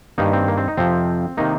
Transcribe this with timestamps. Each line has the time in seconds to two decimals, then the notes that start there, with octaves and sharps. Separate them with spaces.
0.18 G2 D#3 A#3 D#4
0.33 C4
0.48 A#3
0.57 C4
0.68 D#4
0.77 F2 C3 F3 C4
1.37 C3 D#3 A#3 D#4